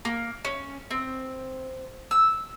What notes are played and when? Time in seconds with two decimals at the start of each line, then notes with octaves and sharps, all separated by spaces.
0.05 A#3
0.45 C#4
0.91 C4
2.11 E6